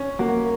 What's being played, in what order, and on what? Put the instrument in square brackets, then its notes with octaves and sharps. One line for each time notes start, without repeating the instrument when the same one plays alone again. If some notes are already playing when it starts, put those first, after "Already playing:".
Already playing: [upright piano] C#4
[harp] A#3 [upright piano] F#4